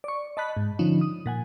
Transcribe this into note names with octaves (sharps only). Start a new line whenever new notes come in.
D5 C#6
D#5 A5 B5 F#6 B6
G#2
D3 F3 C#4 D#4
D#6
A#2 F#5 G#5